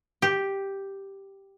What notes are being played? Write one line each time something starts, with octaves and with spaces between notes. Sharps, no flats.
G4